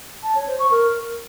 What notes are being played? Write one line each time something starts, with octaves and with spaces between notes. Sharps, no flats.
A5
C#5
C5
C#6
A#4